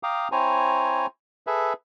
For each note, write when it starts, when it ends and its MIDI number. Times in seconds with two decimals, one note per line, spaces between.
0.03 0.28 77
0.03 0.28 79
0.03 0.28 82
0.03 0.28 86
0.03 0.28 87
0.32 1.06 60
0.32 1.06 64
0.32 1.06 72
0.32 1.06 73
0.32 1.06 80
0.32 1.06 82
1.47 1.73 68
1.47 1.73 69
1.47 1.73 71
1.47 1.73 76